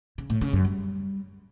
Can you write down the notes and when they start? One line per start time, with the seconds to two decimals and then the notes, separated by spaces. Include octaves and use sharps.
0.18 C#3
0.30 A2
0.41 C#3
0.53 F#2
0.65 G3